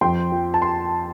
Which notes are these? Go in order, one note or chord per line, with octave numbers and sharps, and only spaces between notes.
F2 G5 C6
F3
A5
C6